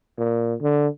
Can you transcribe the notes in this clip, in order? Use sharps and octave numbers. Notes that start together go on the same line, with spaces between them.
A#2
D3